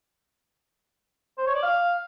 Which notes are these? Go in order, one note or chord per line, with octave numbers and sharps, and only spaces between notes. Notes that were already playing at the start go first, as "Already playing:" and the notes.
C5
C#5
D5
F5